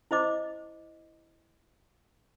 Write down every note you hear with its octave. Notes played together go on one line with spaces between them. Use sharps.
E4 C5 D#5 D6